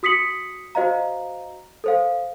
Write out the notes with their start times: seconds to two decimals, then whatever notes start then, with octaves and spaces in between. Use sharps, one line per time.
0.03 F#4 D#6 B6 C#7 F#7
0.75 F#4 C5 D#5 F5 A#5
1.84 A4 C5 F5